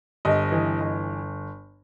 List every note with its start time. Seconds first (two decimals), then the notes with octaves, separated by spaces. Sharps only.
0.25 G1 D#5
0.52 E3
0.80 G1